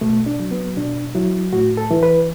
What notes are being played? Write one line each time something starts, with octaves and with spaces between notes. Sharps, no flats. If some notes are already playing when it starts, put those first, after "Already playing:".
B2 A3
D4
F#3
B3
B2 D4
F#3 E4
A2 F#4
A4
E3
B4